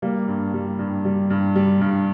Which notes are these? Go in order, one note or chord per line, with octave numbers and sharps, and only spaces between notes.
G3 A#3
G2
G3
G2
G3
G2
G3
G2